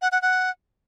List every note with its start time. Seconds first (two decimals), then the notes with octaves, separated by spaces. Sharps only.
0.02 F#5
0.12 F#5
0.22 F#5